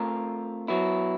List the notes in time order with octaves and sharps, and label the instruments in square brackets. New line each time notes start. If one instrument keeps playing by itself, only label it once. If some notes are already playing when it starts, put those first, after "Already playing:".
Already playing: [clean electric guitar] A3 C4 F4 A#4
F#3 B3 E4